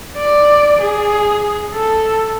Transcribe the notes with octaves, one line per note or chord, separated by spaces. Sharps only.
D5
G#4
A4